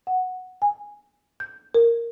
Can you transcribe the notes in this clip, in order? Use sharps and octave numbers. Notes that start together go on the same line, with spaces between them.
F#5
G#5
G6
A#4